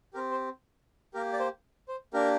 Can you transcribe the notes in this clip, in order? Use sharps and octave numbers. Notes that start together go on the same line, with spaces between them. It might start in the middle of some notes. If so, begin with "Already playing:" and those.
C4 G4 A#4
C5
A#3 G4 A#4
D5
C5
C5
A#3 D4 G4 A#4